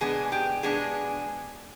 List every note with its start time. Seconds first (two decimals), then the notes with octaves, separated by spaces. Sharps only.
0.01 B2 G#3 B3 D4 G#4 G#5
0.32 G4 G5
0.63 B2 G#3 B3 D4 G#4 G#5